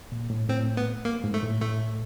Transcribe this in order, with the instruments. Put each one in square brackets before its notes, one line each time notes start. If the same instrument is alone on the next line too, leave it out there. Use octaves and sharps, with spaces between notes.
[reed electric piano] A#2
A2
[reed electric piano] A2 [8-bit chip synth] C4
[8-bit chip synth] B3
A#3
[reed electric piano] G#2
[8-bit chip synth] A3
[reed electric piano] A2
[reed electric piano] A2 [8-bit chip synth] A3